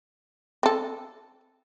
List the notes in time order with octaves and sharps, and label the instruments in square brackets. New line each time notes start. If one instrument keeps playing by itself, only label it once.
[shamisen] C4 A4